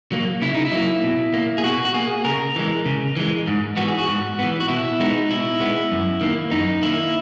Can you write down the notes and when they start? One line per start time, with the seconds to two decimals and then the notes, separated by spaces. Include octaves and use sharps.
0.12 F#3 A#3
0.42 C#3 E4
0.54 D#4
0.65 E4
0.72 F#3 A#3
1.04 B2
1.34 A#3
1.58 G#4
1.64 B2 F#4
1.85 F#4
1.94 A#3 G#4
2.25 C#3 A#4
2.56 E3 G#3
2.86 C#3
3.17 E3 G#3
3.48 G#2
3.77 E3 B3 F#4
3.88 G#4
3.99 F#4
4.08 G#2
4.39 E3 B3
4.60 F#4
4.68 B2 E4
5.00 G#3 B3 D#4
5.30 B2 E4
5.60 G#3 B3
5.92 F#2
6.21 D#3 A#3
6.51 F#2 D#4
6.82 D#3 A#3 E4